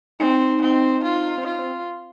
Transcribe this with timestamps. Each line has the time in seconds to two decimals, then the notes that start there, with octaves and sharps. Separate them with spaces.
0.20 C4 D#4
0.61 C4
1.03 F4
1.38 C4
1.45 D#4 F4
1.59 C4